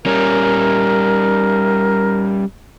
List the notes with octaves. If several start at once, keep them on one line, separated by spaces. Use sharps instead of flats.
G3 C#4 A#4